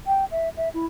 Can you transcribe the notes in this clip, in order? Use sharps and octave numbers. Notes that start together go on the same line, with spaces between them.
G5
E5
E5
E4